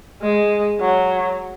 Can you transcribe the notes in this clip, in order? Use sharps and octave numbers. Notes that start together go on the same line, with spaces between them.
G#3
F#3